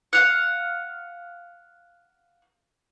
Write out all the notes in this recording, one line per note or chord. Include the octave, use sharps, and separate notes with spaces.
F5 F#5